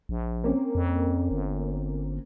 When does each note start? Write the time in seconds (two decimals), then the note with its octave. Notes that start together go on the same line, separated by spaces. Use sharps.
0.09 A#1
0.44 A#3 C4 C#4
0.75 F2
1.31 G1